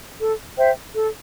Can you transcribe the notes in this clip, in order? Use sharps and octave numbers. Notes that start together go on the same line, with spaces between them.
A4
C5 E5 G5
A4